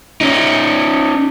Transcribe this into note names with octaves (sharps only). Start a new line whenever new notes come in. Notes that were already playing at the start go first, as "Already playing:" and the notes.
C#4 D#4